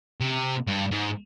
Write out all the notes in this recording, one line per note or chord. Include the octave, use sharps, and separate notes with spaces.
C3
G2
G#2